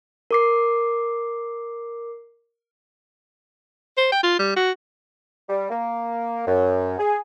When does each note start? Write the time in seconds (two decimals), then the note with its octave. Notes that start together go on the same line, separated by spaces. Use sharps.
0.31 A#4 D6 C7
3.98 C5
4.12 G5
4.23 F4
4.39 G3
4.56 F#4
5.49 G3
5.70 A#3
6.47 F#2
6.99 G#4